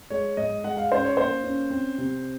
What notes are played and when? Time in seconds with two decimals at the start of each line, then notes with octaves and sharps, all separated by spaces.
0.10 G#3 C#5
0.37 G#2 D#5
0.64 G#3 F#5
0.77 F5
0.92 C#4 C5
1.05 C#5
1.17 A#3 C5
1.44 C#4
1.70 C4
1.98 C3